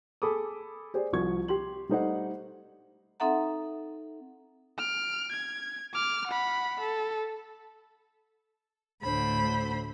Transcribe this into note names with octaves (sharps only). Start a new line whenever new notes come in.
G#4 A4 B5 D6 D#6
G4 G#4 C5 D5
C2 F3 F#4 C#6 G#6
G4 C6 F#7
G3 A3 D#4 C5 D#5 F#5
C4 D#4 A4 E5 F#5 A#5
F6 D7
G#6
D6 F6
F#5 B5
A4
D2 A2 D3 C5 B5